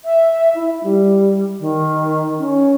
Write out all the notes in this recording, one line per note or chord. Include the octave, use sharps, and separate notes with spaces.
E5
E4
G3
D#3
C#4